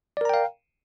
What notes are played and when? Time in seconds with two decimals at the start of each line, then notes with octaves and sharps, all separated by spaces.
0.17 D5
0.21 A#4
0.25 A#5
0.29 G5
0.34 F5